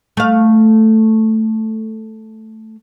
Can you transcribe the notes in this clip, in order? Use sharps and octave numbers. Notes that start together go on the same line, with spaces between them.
A3 F5